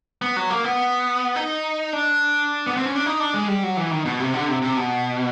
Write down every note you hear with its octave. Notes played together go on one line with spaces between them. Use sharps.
B3
F#3
A#3
B3
D#4
D4
B3
C4
C#4
D4
D#4
D4
G#3
G3
F#3
E3
D#3
B2
C3
D3
C3
C3
B2